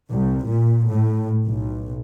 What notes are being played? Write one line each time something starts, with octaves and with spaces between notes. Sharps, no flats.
C2
A#2
A2
B1